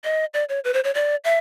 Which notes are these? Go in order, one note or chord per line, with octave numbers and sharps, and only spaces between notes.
D#5
D5
C#5
B4
C5
C#5
D5
E5